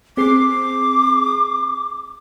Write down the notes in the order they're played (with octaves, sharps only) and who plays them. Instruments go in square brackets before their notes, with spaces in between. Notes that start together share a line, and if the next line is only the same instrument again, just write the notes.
[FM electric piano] C4 G#4 C7 [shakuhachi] D6